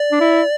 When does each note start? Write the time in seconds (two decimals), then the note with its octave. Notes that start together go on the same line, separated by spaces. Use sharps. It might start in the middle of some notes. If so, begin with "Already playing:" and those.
Already playing: D5
0.12 D4
0.20 E4